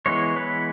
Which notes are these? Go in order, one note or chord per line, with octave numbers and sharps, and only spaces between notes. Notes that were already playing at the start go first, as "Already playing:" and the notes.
E3 G#3 B3 C#5
B4